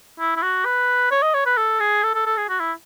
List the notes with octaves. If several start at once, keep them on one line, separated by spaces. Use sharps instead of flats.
E4
E4
F#4
B4
C#5
D#5
C#5
B4
A4
G#4
A4
A4
A4
G#4
F#4
E4